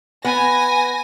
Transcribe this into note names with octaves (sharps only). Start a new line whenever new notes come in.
B3 G#5 A#6